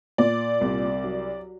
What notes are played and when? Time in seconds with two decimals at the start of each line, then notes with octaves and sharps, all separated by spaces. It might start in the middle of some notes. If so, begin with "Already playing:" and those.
0.18 A#2 D5
0.61 C2
1.04 F#3